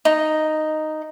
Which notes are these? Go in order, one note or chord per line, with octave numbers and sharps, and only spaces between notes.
D#4